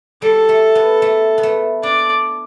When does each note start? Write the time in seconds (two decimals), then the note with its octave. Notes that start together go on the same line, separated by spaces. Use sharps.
0.22 G3 A4
0.49 A3
0.75 B3
1.02 A3
1.38 B3
1.43 A3
1.83 D4 D5